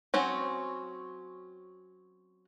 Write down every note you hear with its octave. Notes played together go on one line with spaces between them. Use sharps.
F#3 C4 C#4